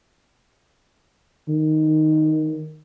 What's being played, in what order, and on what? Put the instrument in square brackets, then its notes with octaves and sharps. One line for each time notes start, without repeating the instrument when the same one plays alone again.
[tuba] D#3